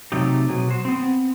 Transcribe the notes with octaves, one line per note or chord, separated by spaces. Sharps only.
C3 F#3 A3 D#4 G4
B2 F#3 G#4
F#4 C5
B3 C4